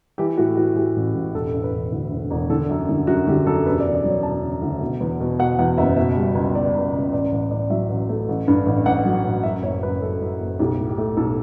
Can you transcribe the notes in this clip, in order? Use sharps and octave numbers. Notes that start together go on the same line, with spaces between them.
E3 G4
A2 F#4
E3 F#4
E3 G4
A1
A1
E1 A4
E1
B4
E1
D2
E1
E1
D3 A4
F#2
D3
F#2 F#4
D3 G4
F#2 A4
E1 B4
D5
E1
D5
F#3
C#5
E1 A5
C#3
D2
B2
E2
B2
B2 F#5
E2 F#5
F#1 E5
B2 E5
G3
C#2
B2 D5
C#2
C#2
A1 D5
A1
A1 D5
F#3 E5
A1
A3
A1
G2
A1
A1 F#5
F#3
A1
F#2 E5
F#1 C#5
F#2 B4
F#2 A4
F#2
F#1
B1 G4
A2
G4
A3
B1 A4